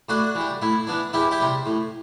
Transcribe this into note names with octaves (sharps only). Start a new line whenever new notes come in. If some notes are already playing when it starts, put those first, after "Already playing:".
A2 D4 F#4
E3 G3
A2 E4
E3 B3 D4
E2 E4 G4
E4 G4
C3 G3
A2